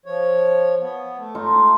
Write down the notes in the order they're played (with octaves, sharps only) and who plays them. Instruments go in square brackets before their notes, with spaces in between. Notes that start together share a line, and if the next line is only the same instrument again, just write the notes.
[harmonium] F3 C#5
B3
A3
[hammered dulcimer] D#4 F4 A4